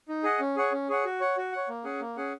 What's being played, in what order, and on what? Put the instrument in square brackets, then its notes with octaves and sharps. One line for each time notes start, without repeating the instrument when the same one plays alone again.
[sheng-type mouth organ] D#4
G#4 D#5 F#5
C#4
G#4 C#5 F#5
C#4
G#4 C#5 F#5
F#4
C#5 F#5
F#4
C#5 F#5
A#3
C#4 G#4 F#5
A#3
C#4 G#4 F#5